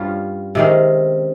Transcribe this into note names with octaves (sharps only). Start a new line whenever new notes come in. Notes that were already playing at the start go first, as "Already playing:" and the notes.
Already playing: G2 G3 C#4 F4
C3 D#3 G#3 C#4